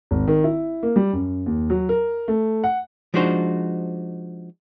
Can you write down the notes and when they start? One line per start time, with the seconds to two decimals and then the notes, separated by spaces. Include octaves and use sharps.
0.11 G#1
0.28 D#3
0.44 E4
0.83 A#3
0.96 G3
1.13 F#2
1.46 D#2
1.70 F#3
1.89 A#4
2.28 A3
2.64 F#5
3.14 F3 G#3 D4 D#4 F#4 C5